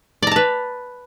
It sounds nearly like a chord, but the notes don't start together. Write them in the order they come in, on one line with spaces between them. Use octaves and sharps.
D5 A#5 A5 B4